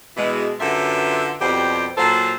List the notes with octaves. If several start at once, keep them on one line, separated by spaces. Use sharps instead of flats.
B2 E3 G#3
F#2 D3 F4 G4 B4 E5
F2 B2 G3 G4 C5
A#2 F#3 F4 A4 C5